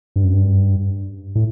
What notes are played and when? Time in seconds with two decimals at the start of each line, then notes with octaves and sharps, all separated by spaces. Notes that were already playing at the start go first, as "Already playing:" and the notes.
0.16 G2
0.24 F#2
0.33 G2
1.35 A2